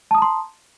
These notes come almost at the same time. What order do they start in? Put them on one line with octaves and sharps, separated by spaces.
A5 D#6 A#5 C6